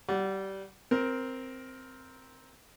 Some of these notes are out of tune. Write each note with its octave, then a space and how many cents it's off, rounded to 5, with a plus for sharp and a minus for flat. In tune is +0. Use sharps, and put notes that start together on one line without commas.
G3 -20 F#5 +10
C4 +0 A#4 +10